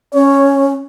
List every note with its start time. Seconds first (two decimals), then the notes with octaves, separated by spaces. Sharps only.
0.14 C#4 C#5